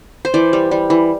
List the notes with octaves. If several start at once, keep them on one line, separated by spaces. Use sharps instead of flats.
C5
E3 D5
G3
G3
E3